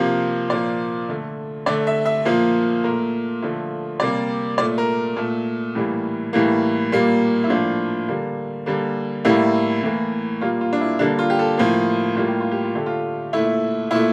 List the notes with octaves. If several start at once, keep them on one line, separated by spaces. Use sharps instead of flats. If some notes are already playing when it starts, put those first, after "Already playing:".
Already playing: C3 F3 A#3
A#2 F3 A#3 D5
D3 A3
D3 A3 D5
E5
E5
A#2 F3 A#3
A#2 A3 A#4
D3 F3 A3
C3 G3 A#3 D5
A#2 A3 D5
A#4
A#2 A3 A4
A2 E3 G3 A#3
A2 E3 G3 A#3
A#2 G3 A#3
E4
A2 F3 A#3 D4
D3 G3 A#3
D3 G3 A#3
A2 G3 A#3 E4
A2 E3 A#3
A#2 G3 A#3 F4
F4
D4
E4
D3 G3 A#3 D4
F4
G4
A4
A2 F3 A#3
A2 G3 A#3 F4
G4
F4
G4
F4
D3 A3 G4
F4
A#2 A3 E4
A#2 A3 E4